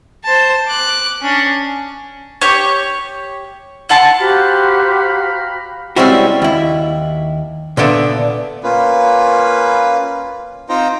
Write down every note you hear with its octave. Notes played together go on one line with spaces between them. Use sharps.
C5 A5
D6 F#6
C#4 D4
G4 C#5
E4 F#5 A5 C6
F#4 G4 C5 F5 A#5 B5
G3 G#3 C4 C#4 E4 F#4
D#2 E4
A#2 D3 B3 D4 E5
A#3 C#4 F4 B4
C4 D#4 F4 C5 G5 A#5